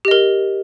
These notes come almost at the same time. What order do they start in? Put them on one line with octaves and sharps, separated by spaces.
G4 D#5 A#4